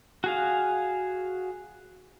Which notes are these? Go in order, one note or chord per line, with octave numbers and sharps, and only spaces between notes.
F#4 G#4 F5